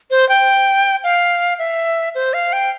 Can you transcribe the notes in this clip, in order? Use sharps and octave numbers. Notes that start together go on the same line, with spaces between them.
C5
G5
F5
E5
C5
F5
G5